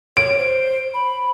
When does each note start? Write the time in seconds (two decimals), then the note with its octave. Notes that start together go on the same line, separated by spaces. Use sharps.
0.17 C#5 D7
0.39 C5
0.94 B5